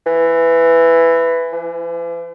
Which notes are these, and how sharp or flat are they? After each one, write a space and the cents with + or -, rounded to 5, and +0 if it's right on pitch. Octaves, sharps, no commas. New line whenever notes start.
E3 +10
E3 +45